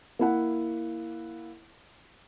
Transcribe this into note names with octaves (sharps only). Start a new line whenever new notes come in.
A#3 E4 F#5